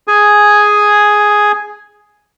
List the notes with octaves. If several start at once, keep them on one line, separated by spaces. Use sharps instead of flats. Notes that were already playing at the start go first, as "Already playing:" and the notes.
G#4 G#5